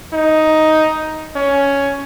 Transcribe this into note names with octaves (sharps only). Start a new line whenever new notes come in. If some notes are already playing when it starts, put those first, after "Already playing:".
D#4
C#4